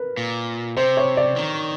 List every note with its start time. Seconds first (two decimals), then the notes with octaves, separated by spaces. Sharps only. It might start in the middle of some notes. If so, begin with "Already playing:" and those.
Already playing: A#4 B4
0.17 A#2
0.77 C3 C5
0.97 C#5
1.17 D5
1.36 D#3